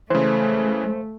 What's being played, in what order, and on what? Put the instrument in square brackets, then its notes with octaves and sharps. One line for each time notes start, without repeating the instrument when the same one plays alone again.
[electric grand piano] C#3 E3 [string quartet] A3 [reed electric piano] C5